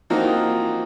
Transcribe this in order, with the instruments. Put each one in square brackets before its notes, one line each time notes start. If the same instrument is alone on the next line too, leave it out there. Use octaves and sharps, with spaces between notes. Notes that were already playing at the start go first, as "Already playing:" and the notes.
[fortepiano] E3 F3 A#3 C4 D#4 F#4